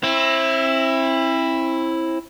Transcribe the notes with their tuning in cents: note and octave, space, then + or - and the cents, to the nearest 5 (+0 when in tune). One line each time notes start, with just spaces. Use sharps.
C4 +35 E4 +0